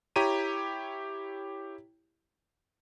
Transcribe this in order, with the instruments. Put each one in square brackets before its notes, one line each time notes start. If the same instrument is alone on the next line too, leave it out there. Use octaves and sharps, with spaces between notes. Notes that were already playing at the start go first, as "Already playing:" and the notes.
[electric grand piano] E4 G4 C#5 A#5 D#7